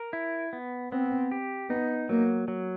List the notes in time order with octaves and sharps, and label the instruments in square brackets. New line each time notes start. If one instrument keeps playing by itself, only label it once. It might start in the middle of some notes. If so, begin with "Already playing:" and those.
Already playing: [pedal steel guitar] A#4
E4
B3
[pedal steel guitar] B3 [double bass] C4
[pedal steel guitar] G4
[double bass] B3 [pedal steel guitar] D#4
[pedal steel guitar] F#3 [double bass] A#3
[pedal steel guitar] F#3